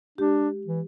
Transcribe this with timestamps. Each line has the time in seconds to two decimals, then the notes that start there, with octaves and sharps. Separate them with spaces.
0.18 G#3 D4 G4
0.67 E3